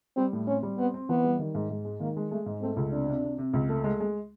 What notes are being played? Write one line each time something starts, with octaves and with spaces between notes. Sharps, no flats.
G3 C4
A2
C4 C#4
G3
B3 C4
C4
E3 B3
G3
D#3
G#2
G#2
G#3
D#3 A#3
G#3
G#3 A3
G#2
A3 C4
C#2
C3 D4
C3
C3
C3
C#2
A3
G#3
G#3